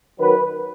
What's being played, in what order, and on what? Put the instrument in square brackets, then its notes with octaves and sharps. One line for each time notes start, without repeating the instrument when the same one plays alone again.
[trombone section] F#2 D#3 F#3 B4